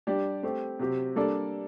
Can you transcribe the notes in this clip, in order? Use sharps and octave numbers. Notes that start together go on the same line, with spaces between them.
G3 D4 G4 D5
A3 C4 G4
C3 F#3 C4 G4
G3 A#3 D4 A4 D5